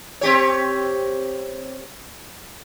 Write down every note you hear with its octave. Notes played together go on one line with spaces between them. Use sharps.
C4 G4 C#5